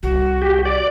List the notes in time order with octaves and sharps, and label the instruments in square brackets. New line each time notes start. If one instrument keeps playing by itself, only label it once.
[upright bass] C2 [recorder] F#4
[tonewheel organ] G4
D5